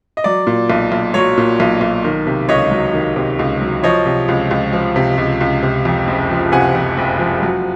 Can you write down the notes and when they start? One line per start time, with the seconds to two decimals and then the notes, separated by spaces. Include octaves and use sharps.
0.17 D#5
0.24 F#3 D5
0.47 A#2
0.70 B1
0.92 B1
1.14 F#3 C#5
1.37 A#2
1.60 B1
1.81 B1
2.04 D#3
2.27 C3
2.49 C#2 C#5 D#5
2.71 F#3
2.93 D#3
3.16 C3
3.39 C#2
3.61 F#3
3.83 F3 C#5 D#5
4.06 C3
4.28 C#2
4.51 C#2
4.73 F3
4.96 C3
5.18 C#2
5.41 C#2
5.63 C3
5.85 F2
6.08 F#1
6.31 F3
6.52 C3 F#5 G#5
6.75 F2
6.97 F#1
7.19 F3
7.42 F#3